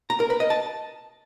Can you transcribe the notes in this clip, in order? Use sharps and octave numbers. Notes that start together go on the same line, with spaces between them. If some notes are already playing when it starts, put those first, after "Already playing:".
A#5
A#4
B4
D#5
A5